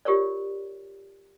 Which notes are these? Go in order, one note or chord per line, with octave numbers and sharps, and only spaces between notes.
F4 G4 A#4 C#5 D5